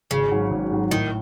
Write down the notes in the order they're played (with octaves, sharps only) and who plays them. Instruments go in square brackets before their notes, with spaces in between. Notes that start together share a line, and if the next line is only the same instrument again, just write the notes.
[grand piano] G#1 [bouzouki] C#3
[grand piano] G#2 F#3
G#1
G#2 F#3
[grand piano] A2 [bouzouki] D#3